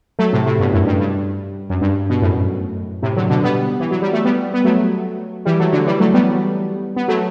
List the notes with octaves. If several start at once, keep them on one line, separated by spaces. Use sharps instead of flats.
F#3 A3
A2 C3
A2 C3
G2 B2
F#2 A2
G2
G2
F#2
G2
B2
F#2 A2
A2 C3
D3 F#3
B2 D3
G3 B3
E3
F#3
G3
A3
G3 B3
B3
F#3 A3
E3 G3
F#3 A3
D3 F#3
E3 G3
F#3 A3
G3 B3
B3
F#3 A3